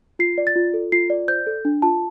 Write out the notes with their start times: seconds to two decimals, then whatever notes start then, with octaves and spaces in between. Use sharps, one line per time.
0.19 F4 C7
0.38 D5
0.47 A6
0.56 F4
0.74 A4
0.92 F4 C7
1.10 D5
1.28 C5 G6
1.47 A4
1.65 D4
1.82 F4 A5